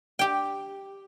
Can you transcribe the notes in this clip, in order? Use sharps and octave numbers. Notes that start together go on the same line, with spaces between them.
G4 G5